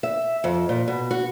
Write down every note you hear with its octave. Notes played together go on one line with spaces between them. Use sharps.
E5
F2
A#2
B2
F#4